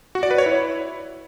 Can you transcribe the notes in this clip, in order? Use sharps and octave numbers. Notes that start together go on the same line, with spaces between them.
F#4
D5
B4
C#5
E4